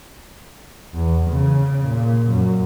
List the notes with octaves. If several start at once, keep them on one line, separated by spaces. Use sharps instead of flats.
E2
C#3
A#2
F#2